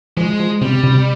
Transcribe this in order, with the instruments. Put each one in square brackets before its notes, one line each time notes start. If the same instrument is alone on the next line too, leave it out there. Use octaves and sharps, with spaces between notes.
[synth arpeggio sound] F3 [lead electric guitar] G#3
[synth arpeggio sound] F3
[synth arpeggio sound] C3 [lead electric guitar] G3
[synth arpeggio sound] C3